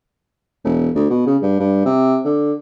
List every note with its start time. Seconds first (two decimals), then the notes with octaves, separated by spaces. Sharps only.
0.64 E1
0.95 D2
1.10 B2
1.26 C#3
1.42 G2
1.59 G2
1.85 C3
2.25 D3